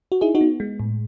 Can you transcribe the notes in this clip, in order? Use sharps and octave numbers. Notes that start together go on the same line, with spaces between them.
F#4
D#4 E4 G#4
D#4 F#4
B3
G#3
A2